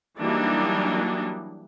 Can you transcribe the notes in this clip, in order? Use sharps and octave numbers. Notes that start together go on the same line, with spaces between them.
E3 F#3 G3 A#3 D4 D#4